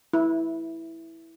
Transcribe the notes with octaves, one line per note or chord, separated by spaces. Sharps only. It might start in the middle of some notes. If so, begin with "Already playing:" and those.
E4